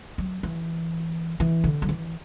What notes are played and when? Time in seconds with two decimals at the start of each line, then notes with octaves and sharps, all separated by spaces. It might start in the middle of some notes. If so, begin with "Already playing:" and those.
0.18 F#3
0.43 E3
1.40 E3
1.64 D3
1.82 F#3
1.89 E3